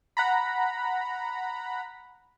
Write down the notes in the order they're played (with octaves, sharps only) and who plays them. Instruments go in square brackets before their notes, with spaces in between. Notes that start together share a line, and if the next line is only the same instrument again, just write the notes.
[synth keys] F#5 A#5 B5